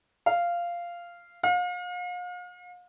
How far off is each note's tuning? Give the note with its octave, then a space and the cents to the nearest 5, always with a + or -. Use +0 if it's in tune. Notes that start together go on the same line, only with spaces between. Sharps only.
F5 -10
F5 +40